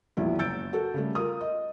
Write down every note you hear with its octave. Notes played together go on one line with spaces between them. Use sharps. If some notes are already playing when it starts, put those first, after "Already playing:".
E1 A#1 F#3 E4
F#1 E6 G6 A6 D7
F#4 A4
C#3 G3 A3
F4 A#4 D#6
D#5